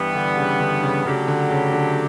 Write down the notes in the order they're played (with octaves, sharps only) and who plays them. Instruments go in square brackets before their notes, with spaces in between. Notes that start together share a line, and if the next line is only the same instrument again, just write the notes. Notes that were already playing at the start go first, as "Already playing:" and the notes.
Already playing: [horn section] G2 E3 G3 B3
[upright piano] D3
C#3
D3
C#3
[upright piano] C#3 [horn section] F#3 A3 D4 G4
[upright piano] D3
C#3
D3